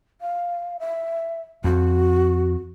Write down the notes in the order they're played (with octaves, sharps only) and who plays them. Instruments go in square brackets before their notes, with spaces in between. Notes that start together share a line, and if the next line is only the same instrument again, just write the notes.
[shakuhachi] F5
E5
[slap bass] F2 [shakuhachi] F#4